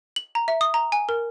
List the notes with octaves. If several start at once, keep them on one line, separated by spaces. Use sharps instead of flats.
F#7
A#5
E5
D#6
A#5
G#5
A#4